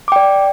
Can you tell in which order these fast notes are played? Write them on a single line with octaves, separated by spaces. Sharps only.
D6 G5 D5